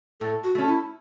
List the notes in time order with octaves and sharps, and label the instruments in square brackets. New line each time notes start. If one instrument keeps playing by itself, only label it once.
[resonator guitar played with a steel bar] A2 [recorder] A4
[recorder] F#4
[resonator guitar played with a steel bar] A3 C#4 A4
[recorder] E4